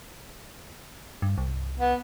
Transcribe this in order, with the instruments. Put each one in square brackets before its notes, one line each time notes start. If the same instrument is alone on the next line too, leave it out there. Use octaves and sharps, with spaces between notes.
[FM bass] G2
C2
[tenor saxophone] B3